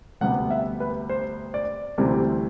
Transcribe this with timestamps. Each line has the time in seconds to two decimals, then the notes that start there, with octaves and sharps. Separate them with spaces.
0.21 D2 C3 G3 B3 F#5
0.51 E5
0.80 B4
1.09 C5
1.54 D5
1.98 D2 C3 E3 G3 C4